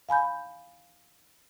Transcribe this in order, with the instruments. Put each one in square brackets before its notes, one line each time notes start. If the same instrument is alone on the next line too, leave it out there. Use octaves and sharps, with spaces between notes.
[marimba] F5 G#5 B5 G6